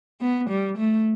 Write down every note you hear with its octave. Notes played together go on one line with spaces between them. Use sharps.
B3
G3
A3